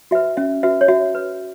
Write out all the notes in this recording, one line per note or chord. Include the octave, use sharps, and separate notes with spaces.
F#4 B4 E5
C#4 E5
F#4 B4 E5
C#5
F#4 E5
B4